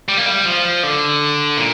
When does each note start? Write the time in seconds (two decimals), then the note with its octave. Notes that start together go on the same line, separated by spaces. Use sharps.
0.08 G3
0.17 A#3
0.26 G3
0.46 F3
0.83 D3
1.58 A#2